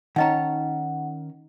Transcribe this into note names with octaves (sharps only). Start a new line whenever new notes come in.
D#3 C#4 D#4 C#5 D#5 F#5 A#5